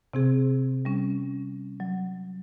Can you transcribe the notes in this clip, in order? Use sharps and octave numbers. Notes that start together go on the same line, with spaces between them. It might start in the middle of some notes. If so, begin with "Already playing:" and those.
C3 C4 G#4
G3 C#4
F#3